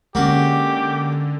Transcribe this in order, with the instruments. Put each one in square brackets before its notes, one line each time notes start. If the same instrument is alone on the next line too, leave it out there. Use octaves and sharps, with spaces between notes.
[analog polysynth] D3 [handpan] G#3 C#4 [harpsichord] A#3 F#4 [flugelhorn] G4